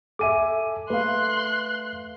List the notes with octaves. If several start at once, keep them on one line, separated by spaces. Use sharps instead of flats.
A4 E5 G#5 D6 D#7
A3 B4 F5 C6 F#6